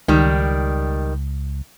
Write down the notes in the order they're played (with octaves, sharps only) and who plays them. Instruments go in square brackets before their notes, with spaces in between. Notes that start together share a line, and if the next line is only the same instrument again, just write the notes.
[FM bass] C#2 [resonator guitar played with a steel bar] D#3 G3